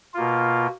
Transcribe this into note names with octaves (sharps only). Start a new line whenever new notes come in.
B2 A#3 F4